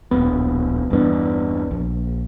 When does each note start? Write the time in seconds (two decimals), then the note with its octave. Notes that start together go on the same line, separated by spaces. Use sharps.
0.11 D1 A#1 B3
0.90 G1 E2 B3 D4
1.71 A#1